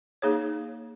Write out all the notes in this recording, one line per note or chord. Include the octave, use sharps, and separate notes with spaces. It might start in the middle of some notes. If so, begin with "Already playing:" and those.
A#3 D#4 G#4 C#5